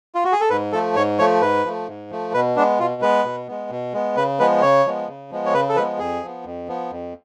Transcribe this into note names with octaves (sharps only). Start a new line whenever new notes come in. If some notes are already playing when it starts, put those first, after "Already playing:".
F4
F#4
G#4
A4
G#2 B4
F3 A3 A4
G#2 C#5
F3 A3 C#5
G#2 B4
F3 A3
G#2
F3 A3
B2 B4
G#3 B3 D4
B2 F4
G#3 B3 B4
B2
G#3 B3
B2
G#3 B3
C#3 B4
F3 G#3 B3 B4
C#3 C#5
F3 G#3 B3
C#3
F3 G#3 B3
C#5
C#3 B4
A4
F3 G#3 B3 B4
F2 G#4
F3 B3
F2
F3 B3
F2